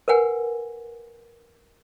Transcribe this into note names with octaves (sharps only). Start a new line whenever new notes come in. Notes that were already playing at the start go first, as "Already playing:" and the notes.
A#4 B4 F#5 G#5